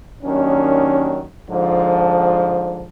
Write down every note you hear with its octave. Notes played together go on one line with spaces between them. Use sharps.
D#2 D#3 F#3 C#4 D4
G#2 D3 F3